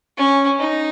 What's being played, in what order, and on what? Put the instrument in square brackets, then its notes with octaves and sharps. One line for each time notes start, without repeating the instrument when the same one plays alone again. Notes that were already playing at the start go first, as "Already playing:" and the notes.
[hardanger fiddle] C#4
D#4